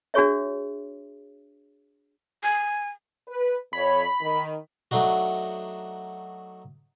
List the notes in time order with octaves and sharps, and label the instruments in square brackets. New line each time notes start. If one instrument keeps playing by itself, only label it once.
[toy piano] D4 F#4 G#4 C#5 E5
[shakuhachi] G#5
[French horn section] B4
[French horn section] F2 C#5 [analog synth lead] B5
[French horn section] D#3
[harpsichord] F#3 A3 D4 D#4 F#4